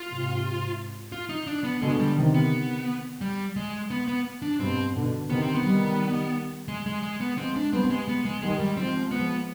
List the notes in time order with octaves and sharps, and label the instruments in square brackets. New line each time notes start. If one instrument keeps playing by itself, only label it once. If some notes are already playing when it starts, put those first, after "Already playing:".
Already playing: [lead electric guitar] F4
[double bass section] G#2 C3
[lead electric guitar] F4
D#4
D4
B3
[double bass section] B2 D3 [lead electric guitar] G#3
[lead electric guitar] G3
[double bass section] C3 D#3
[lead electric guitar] B3
G3
G#3
B3
B3
D4
[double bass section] G2 B2 [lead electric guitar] C4
[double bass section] B2 D3
[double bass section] C3 D#3 [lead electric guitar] B3
[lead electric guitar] C4
B3
[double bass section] D#3 G3
[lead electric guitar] G#3
G#3
G#3
B3
[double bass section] F3 G#3 [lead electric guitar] C4
[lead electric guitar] D4
[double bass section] G3 B3 [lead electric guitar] C4
[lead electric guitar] G#3
B3
G#3
[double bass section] D#3 G3 [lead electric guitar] G#3
[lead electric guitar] G3
[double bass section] F3 G#3 [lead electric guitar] C4
[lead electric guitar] B3